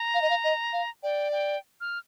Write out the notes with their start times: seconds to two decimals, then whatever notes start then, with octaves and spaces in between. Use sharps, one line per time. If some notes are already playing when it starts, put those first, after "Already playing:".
Already playing: A#5
0.14 F5
0.22 D#5
0.30 F5
0.44 D#5
0.73 F5
1.03 D5 G5
1.32 G5
1.81 F6